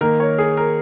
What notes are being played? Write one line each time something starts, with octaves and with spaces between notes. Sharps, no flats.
D#3 A#3 A#4
C#5
G#4
A#4